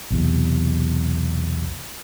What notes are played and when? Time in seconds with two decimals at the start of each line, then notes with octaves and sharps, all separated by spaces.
0.11 B1 E2 C3